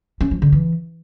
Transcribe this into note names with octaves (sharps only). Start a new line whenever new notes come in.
C#4
F3
D3
E3